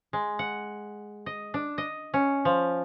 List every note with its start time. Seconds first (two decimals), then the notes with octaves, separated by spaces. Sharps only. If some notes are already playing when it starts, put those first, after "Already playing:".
0.13 G#3
0.39 F#5
1.26 D#5
1.54 D4
1.78 D#5
2.14 C#4
2.45 F3